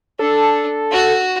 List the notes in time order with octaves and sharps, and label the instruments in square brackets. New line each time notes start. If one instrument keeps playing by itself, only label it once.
[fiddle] D4 [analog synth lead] A4
[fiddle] F#4